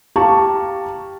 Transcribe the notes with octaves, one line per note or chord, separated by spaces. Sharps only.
G4 F5 A5 A#5 C#6